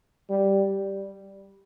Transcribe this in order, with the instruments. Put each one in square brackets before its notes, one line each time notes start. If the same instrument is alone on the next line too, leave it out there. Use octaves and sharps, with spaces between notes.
[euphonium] G3